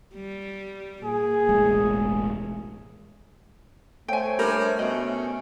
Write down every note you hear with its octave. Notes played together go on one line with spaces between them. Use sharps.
G3
A#2 G#4
E1 A1 G#3
A3 C5 C#5 G5 G#5
G3 D4 A#4
B2 C#4 D#5